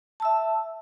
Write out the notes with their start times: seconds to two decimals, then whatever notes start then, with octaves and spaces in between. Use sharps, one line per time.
0.20 A5
0.22 E6
0.25 E5